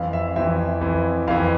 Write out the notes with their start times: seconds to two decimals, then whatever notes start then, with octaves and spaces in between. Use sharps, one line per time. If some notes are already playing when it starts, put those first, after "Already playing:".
Already playing: F2 E3 F5
0.13 E5
0.36 F2 E3 E5
0.81 F2 E3
1.28 F2 E3 F5